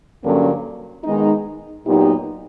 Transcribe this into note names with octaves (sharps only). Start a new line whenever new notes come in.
G2 D3 F#3 A#3 C#4
D#3 G#3 B3 D#4
A#2 F#3 B3 D#4 G4